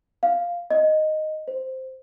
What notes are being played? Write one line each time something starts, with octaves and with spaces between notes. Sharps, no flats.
F5
D#5
C5